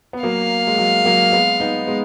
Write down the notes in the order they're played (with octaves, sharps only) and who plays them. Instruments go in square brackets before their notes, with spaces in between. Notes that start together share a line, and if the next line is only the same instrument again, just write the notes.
[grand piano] B3
[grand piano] F#3 A#3 [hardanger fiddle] F5
[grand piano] G#3
F#3
F#3 A#3
G#3 B3
B3 D#4
G#3 B3